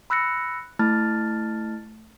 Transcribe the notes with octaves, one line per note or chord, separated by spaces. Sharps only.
B5 E6 F#6 A#6 C#7
A3 E4 A5 F6 A6